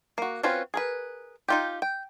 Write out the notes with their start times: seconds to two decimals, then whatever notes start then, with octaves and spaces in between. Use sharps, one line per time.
0.18 A#3 F#4
0.43 C4 C#4 F4 F#4 B4
0.74 G#4 A#4 B4
1.48 D#4 F4 G4
1.82 G5